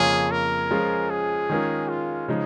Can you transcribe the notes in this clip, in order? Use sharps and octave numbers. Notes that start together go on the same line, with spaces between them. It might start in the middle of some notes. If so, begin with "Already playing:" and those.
Already playing: F2 C#3 A#3 F4 G#4 C#5
A#4
F3 G#3 C#4 F4 G#4
G#4
D#3 G#3 C#4 F4 A#4
F4
C#3 F3 G#3 D#4